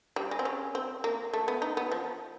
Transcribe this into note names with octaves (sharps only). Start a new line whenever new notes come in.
G3
G#3
C4
C#4
C4
A#3
A3
B3
D#4
B3
F3